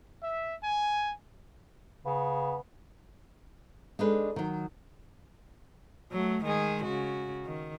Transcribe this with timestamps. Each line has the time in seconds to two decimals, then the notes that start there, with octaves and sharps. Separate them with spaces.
0.23 E5
0.64 G#5
2.05 C#3 B3
3.99 G#3 D4 D#4 A4 B4
4.36 D#3 F#3
6.12 F#3 A3
6.45 D#3 G#3 G#4
6.85 C#3 F#4
7.45 D#3